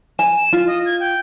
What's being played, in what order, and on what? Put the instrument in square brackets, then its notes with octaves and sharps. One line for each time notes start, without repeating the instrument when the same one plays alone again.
[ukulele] G#5 [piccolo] E7
[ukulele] F4
[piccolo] D#5
G#6
G5